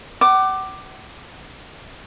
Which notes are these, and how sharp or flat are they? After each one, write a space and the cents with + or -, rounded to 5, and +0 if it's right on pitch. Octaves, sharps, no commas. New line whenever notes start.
F#5 +40 D6 +10